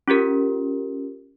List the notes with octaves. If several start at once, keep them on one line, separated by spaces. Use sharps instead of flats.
C#4 F4 G4 A#4